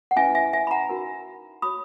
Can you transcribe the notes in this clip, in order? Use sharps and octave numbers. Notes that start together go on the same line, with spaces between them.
F#5
C#4 E4 B4 E5 G#5
E5 G#5
E5 G#5
B5
F#5 A#5
D#4 F#4 A#4
F#4 C#5 B5 D#6